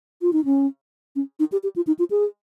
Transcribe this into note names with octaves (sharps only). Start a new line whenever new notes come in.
F4
D#4
C#4
C#4
D#4
G4
G4
F4
D#4
F4
G#4